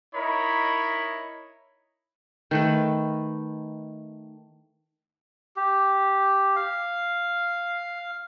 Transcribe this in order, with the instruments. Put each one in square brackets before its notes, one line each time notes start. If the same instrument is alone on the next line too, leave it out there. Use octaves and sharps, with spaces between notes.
[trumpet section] D#4 E4 A#4 C#5 B5
[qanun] D#3 A3 B4
[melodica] G4
F5